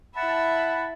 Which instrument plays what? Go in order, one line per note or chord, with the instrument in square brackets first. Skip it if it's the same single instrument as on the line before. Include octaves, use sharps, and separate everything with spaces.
[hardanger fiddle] E4 E5 [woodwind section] F#5 A5 B5